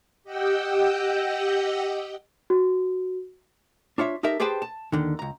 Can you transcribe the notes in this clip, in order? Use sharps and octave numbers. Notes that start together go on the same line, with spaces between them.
G4 D#5 F#5 G5 E6 G6
F#4
D4 F4 C#5 E5
D#4 G4 A4 A#4 E5
G4 G#4 B4 C5 G5 A5
A5
D#2 D3 D#3
C#2 A#5